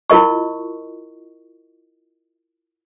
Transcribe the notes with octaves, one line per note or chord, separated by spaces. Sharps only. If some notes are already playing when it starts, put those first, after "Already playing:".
E4 F4 A#4 D#5 C#6